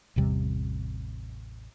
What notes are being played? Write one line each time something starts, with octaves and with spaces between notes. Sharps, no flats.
A1 E2 C3 G3